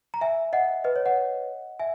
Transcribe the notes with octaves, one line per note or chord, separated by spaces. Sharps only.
A#5
E5 G#5
D#5 F#5
B4 D#5
C#5
D#5 F#5
E5 G#5